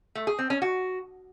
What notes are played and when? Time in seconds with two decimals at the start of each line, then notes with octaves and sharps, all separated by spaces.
0.15 A3
0.27 G#4
0.39 C4
0.50 C#4
0.62 F#4